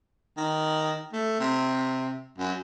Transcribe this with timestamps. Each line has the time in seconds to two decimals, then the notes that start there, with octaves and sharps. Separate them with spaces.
0.37 D#3
1.12 A3
1.40 C3
2.38 F#2